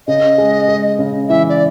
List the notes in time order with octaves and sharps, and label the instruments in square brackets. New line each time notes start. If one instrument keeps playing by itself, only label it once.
[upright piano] C#3 [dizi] D#5
[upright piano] G#3
G#3
C#3
[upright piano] E3 [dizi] E5
[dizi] D5